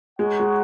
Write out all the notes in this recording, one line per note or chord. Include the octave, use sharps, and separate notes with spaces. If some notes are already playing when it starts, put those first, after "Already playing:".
G#3 D#4 F#4 C#5 F#5
G#3